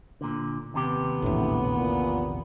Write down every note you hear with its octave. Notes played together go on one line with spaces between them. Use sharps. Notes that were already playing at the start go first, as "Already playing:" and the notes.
A#2 D3
D#2 C3 B3 G4
A#1 E2 A2
A#2